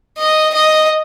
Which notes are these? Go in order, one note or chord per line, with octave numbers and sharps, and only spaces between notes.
D#5
D#5